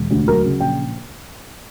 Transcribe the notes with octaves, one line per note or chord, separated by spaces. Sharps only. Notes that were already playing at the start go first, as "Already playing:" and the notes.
Already playing: E1
D2
F#3 A#4
C#3
A#1 G5